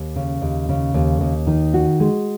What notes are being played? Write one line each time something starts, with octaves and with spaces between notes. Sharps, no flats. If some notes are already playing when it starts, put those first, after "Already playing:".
Already playing: D#2
C#3
D#2
C#3
D#2
D#2
D#3
F#4
G#3